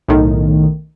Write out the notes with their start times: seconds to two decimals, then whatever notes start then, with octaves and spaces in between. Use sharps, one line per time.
0.08 B1 A2 D#3